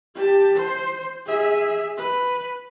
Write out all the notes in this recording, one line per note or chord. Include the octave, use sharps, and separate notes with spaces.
G4 A5
C5
G#4 E5
B4